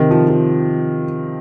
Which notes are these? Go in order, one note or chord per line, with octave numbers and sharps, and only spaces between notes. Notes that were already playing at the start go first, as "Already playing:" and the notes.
Already playing: C3 D#3
F3
F3